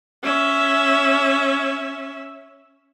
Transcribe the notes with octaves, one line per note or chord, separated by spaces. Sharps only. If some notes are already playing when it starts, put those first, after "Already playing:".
C#4 E5